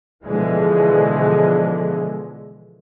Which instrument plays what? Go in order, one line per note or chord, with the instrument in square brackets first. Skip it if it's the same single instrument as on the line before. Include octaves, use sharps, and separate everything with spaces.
[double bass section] B2 D3 E3 F3 G#3